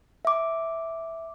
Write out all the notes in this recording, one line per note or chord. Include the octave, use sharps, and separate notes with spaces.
E5 D6